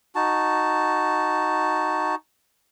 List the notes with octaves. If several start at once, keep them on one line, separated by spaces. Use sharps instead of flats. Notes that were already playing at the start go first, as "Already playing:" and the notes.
D#4 F#4 A5